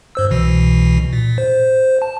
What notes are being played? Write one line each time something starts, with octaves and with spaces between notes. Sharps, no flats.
G2 C5 E6
C2 B2 E3
A#2
C5
A5